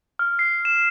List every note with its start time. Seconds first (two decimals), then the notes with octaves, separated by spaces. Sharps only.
0.19 F6
0.39 C7
0.65 E7